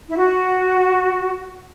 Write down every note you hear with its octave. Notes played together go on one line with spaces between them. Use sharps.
E4
F#4